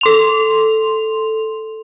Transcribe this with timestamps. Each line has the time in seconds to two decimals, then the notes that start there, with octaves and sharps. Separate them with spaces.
0.01 A4 C6 F7